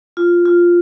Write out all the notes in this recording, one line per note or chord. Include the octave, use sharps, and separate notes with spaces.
F4
F4